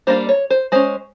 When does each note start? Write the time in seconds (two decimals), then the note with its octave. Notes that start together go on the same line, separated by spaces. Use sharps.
0.07 G3 A#3 D4 C5
0.29 C#5
0.50 C5
0.72 G#3 C#4 C5